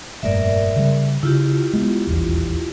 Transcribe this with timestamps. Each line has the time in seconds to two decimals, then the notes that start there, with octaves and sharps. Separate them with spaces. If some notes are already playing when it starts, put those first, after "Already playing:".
0.23 F1 G2 A#2 A#4 D5 E5
0.76 C#3 G3
1.23 C#3 E4 F4 G4
1.73 G#3 B3
2.07 D#1 A#1 E2